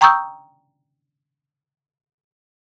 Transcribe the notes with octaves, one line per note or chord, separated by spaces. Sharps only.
G5 A#5 C#6 D#6 E6 G6